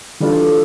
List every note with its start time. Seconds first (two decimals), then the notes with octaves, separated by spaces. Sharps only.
0.20 E3 G3 D4 F4 A4